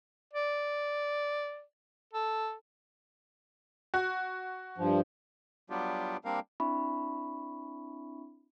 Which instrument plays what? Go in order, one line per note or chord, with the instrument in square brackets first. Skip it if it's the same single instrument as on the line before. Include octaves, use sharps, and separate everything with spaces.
[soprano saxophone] D5
A4
[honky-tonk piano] F#4
[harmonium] G2 F3
[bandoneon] F#3 G3 B3 D4 F4 G4
G3 A#3 C4 D4 A#4 F5
[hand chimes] C4 D4 E4 E5 B5 C#6